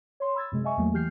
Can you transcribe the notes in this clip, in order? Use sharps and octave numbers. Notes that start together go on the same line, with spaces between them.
C#5 C6
B5 E6 G#6 A6
F#2 C3 G#3
D#5 E5 G#5 C#6
E2 F#3 A3 A#3
E3 G4 F6 G6 C7